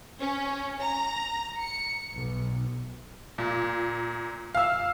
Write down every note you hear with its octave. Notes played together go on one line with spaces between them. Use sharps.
C#4
A#5
C#7
B1
A#2
F5 E6